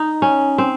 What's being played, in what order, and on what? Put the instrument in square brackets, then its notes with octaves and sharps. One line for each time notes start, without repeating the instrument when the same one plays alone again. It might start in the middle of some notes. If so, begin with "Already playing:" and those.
Already playing: [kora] D#4
C#4
C4